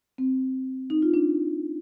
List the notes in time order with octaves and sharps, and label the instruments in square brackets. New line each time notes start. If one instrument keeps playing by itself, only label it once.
[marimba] C4
D#4
F4
D4